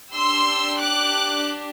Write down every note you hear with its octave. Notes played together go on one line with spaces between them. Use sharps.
D4 G4 C6 E6
D6 F#6